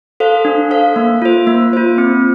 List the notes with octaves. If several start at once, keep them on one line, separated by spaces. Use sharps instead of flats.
A4 C5 F5
D4
A4 C5 F5
A#3
F4 C5
A#3
F4 C5
C4